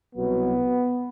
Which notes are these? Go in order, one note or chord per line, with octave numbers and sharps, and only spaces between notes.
C2 B2 F#3 B3